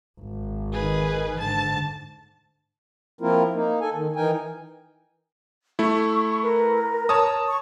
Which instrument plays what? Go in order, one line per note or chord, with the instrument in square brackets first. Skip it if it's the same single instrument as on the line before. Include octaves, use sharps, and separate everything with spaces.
[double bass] G#1
[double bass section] D#3 [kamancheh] G#4 B4
[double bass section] G#2 [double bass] D3 [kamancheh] A5
[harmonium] F3 A#3 C4 E4 F4 A#4
A#3 D#4
A4 G#5
D#3
E3 D#4 A#4 G5 G#5
[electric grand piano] A3 E4 [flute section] C#6
[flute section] A#4 B4
[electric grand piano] C#5 A5 D#6
[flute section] C#6